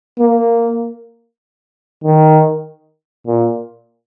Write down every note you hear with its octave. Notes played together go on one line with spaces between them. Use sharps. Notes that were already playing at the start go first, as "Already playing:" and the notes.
A#3
D#3
A#2